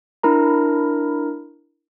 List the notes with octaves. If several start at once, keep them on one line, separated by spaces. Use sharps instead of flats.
D4 E4 A#4 A#5